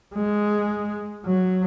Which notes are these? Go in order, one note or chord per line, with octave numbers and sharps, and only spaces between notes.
G#3
F#3